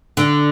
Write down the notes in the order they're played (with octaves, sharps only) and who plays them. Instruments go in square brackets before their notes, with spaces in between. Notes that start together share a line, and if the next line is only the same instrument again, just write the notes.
[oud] D3